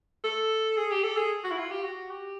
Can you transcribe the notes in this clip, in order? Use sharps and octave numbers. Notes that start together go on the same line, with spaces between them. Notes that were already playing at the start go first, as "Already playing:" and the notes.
A4
G#4
G4
A4
G#4
F#4
E4
F4
G4
F#4
G4